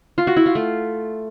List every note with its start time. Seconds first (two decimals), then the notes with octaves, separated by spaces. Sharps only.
0.18 F4
0.27 F#4
0.37 E4
0.46 F4
0.55 A3